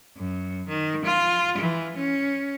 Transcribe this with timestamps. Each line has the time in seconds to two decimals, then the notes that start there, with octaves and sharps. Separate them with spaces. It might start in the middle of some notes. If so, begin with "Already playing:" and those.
0.17 F#2
0.68 D#3
1.05 F4
1.58 E3
1.97 C#4